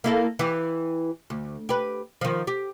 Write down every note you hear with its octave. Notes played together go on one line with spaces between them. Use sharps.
A#3 E4 A4
E3 G4
D2
G4 B4
D#3 F3
G4